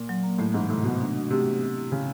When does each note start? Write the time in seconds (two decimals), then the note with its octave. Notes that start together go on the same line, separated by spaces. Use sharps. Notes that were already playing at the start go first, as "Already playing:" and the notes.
Already playing: A#2
0.09 F#3
0.23 A#3
0.38 A2 A3
0.54 G#2 E3
0.70 A2 C3
0.84 B2 A3
1.01 D4
1.15 D4
1.30 C3 A3
1.46 D4
1.61 B3
1.76 E4
1.91 C#3 G#4